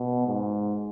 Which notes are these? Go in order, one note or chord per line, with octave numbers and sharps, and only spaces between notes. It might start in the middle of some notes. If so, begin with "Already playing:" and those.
Already playing: B2
G#2